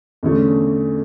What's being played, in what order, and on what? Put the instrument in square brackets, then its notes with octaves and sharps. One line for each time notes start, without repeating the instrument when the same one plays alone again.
[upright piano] E2 D3 A3 C#4